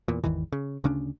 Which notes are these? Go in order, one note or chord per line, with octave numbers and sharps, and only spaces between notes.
E2 A#2
G#1 E2 D#3 E3
C#3
D2 C#3 C#4 D4